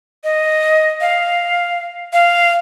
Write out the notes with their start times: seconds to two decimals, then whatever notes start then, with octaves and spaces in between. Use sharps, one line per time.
0.24 D#5
1.01 F5
2.13 F5